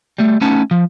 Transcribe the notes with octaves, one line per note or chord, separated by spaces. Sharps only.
G3 A3
A3 B3 C#4 D#4 A5
F3